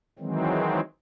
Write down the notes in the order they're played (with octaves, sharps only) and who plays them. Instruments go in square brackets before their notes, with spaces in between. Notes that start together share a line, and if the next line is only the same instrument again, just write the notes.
[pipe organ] D#3 E3 F#3 G#3 C4